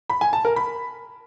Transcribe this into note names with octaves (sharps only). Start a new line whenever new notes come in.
B5
G#5
A5
A#4
B5